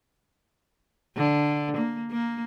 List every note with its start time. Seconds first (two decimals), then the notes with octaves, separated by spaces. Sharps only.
1.16 D3
1.77 A#3
2.12 A#3